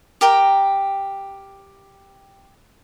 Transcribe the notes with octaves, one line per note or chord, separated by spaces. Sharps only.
G4 A#4 G5 A#5